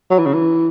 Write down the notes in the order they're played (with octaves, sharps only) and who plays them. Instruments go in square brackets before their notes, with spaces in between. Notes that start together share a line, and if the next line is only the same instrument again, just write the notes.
[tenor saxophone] F#3
E3
C#3
E3